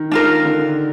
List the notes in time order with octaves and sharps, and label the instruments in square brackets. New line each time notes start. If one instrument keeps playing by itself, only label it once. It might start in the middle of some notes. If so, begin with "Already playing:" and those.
Already playing: [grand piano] D#3
[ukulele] D4 F4 A#4
[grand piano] D3